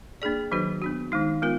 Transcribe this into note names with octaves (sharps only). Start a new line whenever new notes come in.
A#3 D4 G#4 D5
D#3 F#3 D4 F#4 B4
B3 D4 F#4
D#3 G#3 D#4
G#3 B3 F4 A#4